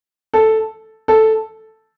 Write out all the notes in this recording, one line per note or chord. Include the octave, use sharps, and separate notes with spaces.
A4
A4